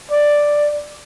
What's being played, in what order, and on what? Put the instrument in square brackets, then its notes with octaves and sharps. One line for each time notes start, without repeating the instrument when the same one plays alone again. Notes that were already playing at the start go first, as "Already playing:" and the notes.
[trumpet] D5